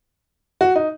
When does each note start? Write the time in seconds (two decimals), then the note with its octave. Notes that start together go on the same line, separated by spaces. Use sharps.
0.61 F#4
0.76 D#4